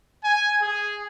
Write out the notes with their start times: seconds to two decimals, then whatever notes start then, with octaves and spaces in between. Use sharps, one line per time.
0.25 G#5
0.62 G#4